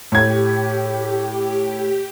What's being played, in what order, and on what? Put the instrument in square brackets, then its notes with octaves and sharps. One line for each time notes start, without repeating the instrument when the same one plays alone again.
[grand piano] A2 G#6 [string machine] G4